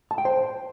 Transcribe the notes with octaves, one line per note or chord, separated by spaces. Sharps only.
A5
G5
C5